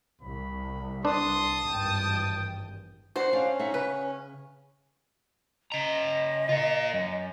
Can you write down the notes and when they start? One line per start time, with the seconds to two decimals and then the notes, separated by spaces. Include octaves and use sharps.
0.21 C2 B5
1.05 D4 B4 A5 C6 D#6
1.67 G#1 G2 E3 G5
3.16 D4 F#4 C5 F#5
3.33 C#4 D4 F5
3.59 D#4 E5 F#5
3.74 C#3 B4
5.72 C#3 D#5 A#5
6.49 F4 A#4
6.94 F#2